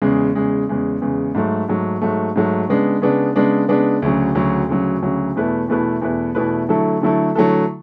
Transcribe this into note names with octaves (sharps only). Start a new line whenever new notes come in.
E2 C#3 G#3
E2 C#3 G#3
E2 C#3 G#3
E2 C#3 G#3
G#2 F#3 A3
G#2 F#3 A3
G#2 F#3 A3
G#2 F#3 A3
C#3 G#3 B3 D4
C#3 G#3 B3 D4
C#3 G#3 B3 D4
C#3 G#3 B3 D4
D2 C#3 F#3
D2 C#3 F#3
D2 C#3 F#3
D2 C#3 F#3
E2 B2 A3 E4 B4
E2 B2 A3 E4 B4
E2 B2 A3 E4 B4
E2 B2 A3 E4 B4
D3 F#3 A3 E4 A4
D3 F#3 A3 E4 A4
D3 F#3 A3 E4 A4